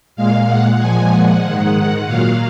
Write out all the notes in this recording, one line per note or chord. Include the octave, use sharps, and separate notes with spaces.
A#2 G#3 F5
F#5
A#2 F3 G#3 G#5
F#5
G#2 D#3 G#3
A#2 F#3 F5